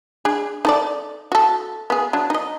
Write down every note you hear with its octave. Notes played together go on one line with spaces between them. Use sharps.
D4 G#4
D#4 A4 D5
F#4 A4
B3 G#4
F#3 D4
D#4 D#5